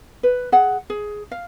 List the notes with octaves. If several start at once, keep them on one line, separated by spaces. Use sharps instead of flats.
B4
G#4 F#5
G#4
F5